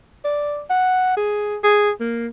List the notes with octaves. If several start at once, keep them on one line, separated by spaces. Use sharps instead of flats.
D5
F#5
G#4
G#4
A#3